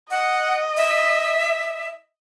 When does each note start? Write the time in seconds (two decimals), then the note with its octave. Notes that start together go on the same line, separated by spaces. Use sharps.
0.11 D#5 F#5
0.77 E5